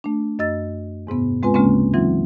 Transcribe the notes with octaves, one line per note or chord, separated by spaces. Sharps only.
A3 D4
F#2 D#5 E6 A6
E2 G#2 C3 B3
G#3 C4 F4 B4 G#5
D2 C#3 G#3 A#3 C4 C#4
E3 F#3 C4 D#4 F4